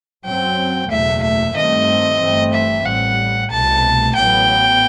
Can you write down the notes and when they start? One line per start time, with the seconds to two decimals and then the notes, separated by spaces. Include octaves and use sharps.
0.25 F#2 F#3 C4 G5
0.91 F#1 E2 B2 A3 E5
1.22 E5
1.56 G2 D#3 A3 C4 D#5
2.20 G1 G2 E3 A3 C4
2.53 E5
2.85 A1 A2 G3 F#5
3.51 C2 B2 A3 A5
4.16 A1 A2 F#3 B3 G5